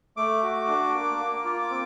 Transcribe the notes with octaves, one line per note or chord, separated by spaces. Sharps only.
A3 D6
F#4
D4
A#3
A#3
F4
C4